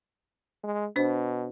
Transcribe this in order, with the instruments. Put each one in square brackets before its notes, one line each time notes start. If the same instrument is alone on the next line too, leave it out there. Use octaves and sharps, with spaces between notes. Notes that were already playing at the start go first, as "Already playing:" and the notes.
[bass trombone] G#3
[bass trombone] B2 [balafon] D4 C5